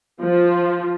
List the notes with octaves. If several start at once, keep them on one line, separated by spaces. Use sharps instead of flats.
F3